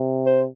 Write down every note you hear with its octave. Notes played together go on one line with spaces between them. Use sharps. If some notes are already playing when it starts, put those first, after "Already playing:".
Already playing: C3
C5